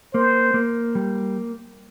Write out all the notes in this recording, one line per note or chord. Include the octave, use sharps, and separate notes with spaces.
A#3 C5
A#3
G3